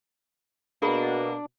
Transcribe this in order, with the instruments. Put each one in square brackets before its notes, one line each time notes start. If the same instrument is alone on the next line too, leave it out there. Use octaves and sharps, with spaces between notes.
[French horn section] B2 [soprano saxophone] A#3 [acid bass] D4 [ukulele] G#4 F#5 B5